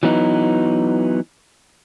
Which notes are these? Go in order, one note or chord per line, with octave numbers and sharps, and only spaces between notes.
E3 F#3 B3 D#4